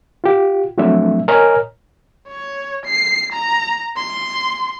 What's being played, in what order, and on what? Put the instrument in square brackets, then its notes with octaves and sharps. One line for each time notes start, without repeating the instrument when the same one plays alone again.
[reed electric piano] F4 G4
F3 F#3 A3 C4 D4 E5
A#4 C#5 D#5 G#5 A#5 F6
[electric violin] C#5
C7
A#5
C6